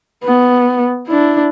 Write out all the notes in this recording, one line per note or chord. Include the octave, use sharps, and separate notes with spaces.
B3
D4 E4